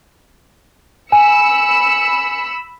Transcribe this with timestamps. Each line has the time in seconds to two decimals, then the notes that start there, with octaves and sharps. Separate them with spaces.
1.12 G#5 B5 E6 C#7